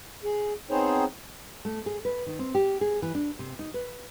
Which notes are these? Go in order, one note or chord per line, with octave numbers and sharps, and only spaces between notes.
G#4
B3 C4 D#4 G#4 C5 C#5
A3
G#4
B4
D#3
C4
G4
G#4
E3
D4
C3
D#4
B4